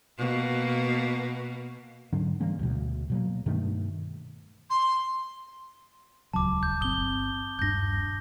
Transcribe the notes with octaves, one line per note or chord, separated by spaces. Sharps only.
B2 A#3
G#2 D3 F#3 C#4
E3 G3 A#3 C#4
D2 B2
B2 F#3 A#3
G2 B2 D#3 A3
C6
D#1 C#2 F#3 A5 D6
G6
G1 C4 D#6 G7
D#1 G2 D4 G6 A#6